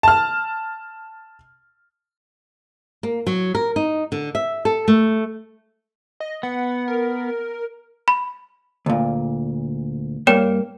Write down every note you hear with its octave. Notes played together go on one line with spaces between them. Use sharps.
A5 F6
A#3
F#3
A#4
D#4
D3
E5
A4
A3
D#5
B3 F#5
A#4
B5
D2 A#2
G2 A#3 C#5 G5 E7